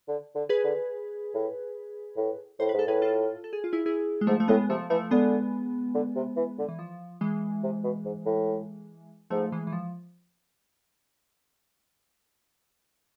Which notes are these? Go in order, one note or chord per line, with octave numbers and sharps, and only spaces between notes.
D3
D3
G#4 B4
D3
A2
A2
A2 C5
G#2 B4
A4
A2 G#4 B4
F4 A4
A4
G#4
F4
E4 G#4
E4 G#4
G#3
G#2 F3 A3
A3
A2 G#3 B3
C3 F3 A3
E3 F3 A3
D3 G#3 B3
D3
C3
E3
D3
E3
F3
E3 G#3
C3
B2
G#2
A2
G#2 F3 A3
E3 G#3
E3
F3